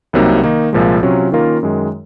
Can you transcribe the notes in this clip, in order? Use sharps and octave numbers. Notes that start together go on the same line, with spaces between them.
C2 C3 F#3 A#3 D#4
D#3 A#3 D#4
C2 A#2 F3 G#3
C3 F#3 C#4 F4
D#3 A#3 C#4 F4 A#4
F#2 D#3 G#3